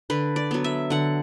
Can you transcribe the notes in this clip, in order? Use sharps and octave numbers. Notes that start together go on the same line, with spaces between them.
D3 B4
D5
F#3 B3
E5
D3 F#5